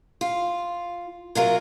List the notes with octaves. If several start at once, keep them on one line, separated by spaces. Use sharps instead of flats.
F4
C3 F#3 F4 A#4